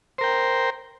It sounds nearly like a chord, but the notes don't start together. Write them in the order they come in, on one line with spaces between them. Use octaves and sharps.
C5 A#4 G5